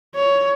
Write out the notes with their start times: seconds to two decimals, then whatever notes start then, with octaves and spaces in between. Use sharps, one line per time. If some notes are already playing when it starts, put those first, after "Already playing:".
0.15 C#5